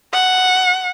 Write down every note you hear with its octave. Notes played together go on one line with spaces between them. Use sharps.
F#5